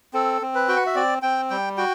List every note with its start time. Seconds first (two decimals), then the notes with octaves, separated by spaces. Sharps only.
0.14 C4 A4
0.42 C4
0.55 B4
0.68 F#4 G5
0.76 F#5
0.86 E5
0.95 C4 D5
1.22 C4 G5
1.50 G3 G5
1.77 F#4 G5